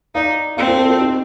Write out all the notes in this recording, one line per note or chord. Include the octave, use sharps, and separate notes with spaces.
D#4 D5 F5
C4 D5 F5
A4 C5
A4 C5
F4 A4
D#4 G4